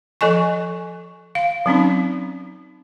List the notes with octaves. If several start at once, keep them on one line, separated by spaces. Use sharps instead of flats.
F3 A4 D#5 G#5 C#6
F5
F#3 C4 C#4 D#4